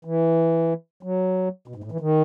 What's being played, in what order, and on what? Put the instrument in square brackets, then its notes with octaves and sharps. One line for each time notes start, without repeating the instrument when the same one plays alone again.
[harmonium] E3
F#3
B2
G#2
A2
E3
D#3